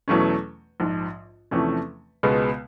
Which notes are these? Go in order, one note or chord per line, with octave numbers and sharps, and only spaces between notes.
E2 B2 F#3 A3 C#4
A#1 G#2 F3
E2 C3 F3 A3 C#4
C#2 B2 G#3 B3